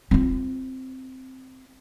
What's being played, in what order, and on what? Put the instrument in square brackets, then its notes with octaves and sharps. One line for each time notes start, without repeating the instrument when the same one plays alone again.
[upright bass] C4 F4